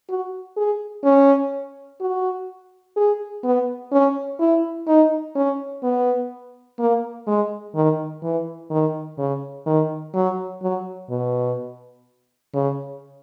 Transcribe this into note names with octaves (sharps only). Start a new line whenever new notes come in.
F#4
G#4
C#4
F#4
G#4
B3
C#4
E4
D#4
C#4
B3
A#3
G#3
D#3
E3
D#3
C#3
D#3
F#3
F#3
B2
C#3